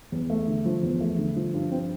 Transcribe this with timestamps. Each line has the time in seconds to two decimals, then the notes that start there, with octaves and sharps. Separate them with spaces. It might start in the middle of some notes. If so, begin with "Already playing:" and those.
0.12 E2
0.30 A3
0.47 D3
0.65 F3
0.83 E2
1.00 A3
1.18 D3
1.36 F3
1.54 G2
1.71 C4